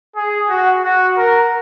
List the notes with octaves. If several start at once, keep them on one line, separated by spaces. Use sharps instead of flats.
G#4
F#4
F#4
A#4